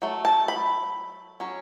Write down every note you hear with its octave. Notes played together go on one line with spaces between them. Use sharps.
F#3 A3
A5
B5
F#3 C#4